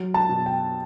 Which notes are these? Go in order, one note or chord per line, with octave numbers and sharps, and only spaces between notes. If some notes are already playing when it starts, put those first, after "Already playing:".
Already playing: F#3
A5
B2
G5